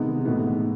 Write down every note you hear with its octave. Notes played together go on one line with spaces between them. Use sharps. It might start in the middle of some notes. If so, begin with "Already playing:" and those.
Already playing: C3 D#3 G#3 B3 D#4
A2 E3 G#3 B3 D#4